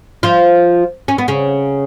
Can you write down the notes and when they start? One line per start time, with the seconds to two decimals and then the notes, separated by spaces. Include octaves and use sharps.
0.23 F3 F4
1.08 C#4
1.18 B3
1.28 C#3 C#4